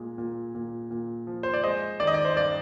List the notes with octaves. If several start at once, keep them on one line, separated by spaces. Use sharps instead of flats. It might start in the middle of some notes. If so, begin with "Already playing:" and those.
Already playing: A#2 G#3
A#2
A#2
A#2
F3
C5
D5
G#3 C5 D#5
D#3 D5
D#5
D5
C5
G2 D5